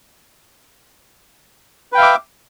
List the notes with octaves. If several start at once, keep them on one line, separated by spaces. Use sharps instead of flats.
B4 E5 F5 G5 D6